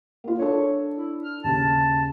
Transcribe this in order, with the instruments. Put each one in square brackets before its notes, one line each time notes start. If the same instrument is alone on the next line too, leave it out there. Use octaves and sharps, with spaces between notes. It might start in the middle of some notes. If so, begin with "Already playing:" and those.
[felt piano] A#3 F4
[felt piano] D4 A4 [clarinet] C#5
[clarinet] E4
F6
[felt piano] D#2 C#3 [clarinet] A5